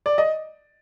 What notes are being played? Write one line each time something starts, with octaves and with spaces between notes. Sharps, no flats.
D5
D#5